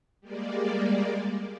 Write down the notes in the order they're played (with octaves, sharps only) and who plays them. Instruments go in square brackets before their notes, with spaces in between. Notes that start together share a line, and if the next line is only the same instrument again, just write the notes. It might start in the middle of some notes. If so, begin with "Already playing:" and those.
[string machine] G3 G#3 A#3 D5